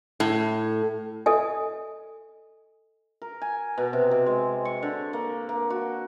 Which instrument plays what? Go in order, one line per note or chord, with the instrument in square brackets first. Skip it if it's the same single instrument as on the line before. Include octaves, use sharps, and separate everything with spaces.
[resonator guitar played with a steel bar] A2
[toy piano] A4 D#5 G#5
[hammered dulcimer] A#4
G#5
B2
C3
C3
G#3
C#6
D3
A#3
A#3
F#4